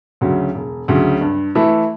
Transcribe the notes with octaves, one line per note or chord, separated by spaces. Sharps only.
D2 C#3 F#3
E1
D2 C#3 F#3
G2
E3 A3 E4